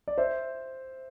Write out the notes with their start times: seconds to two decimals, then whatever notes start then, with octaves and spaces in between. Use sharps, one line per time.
0.08 D5
0.18 C5 E5